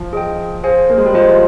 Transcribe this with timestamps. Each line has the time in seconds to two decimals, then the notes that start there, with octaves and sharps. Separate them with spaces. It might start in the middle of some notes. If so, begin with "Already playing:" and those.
Already playing: F3
0.13 G#4 D#5 G5
0.64 G#4 C5 F5 G#5
0.90 A#3
0.98 G#3
1.06 G3
1.14 F3 F4 C5 D#5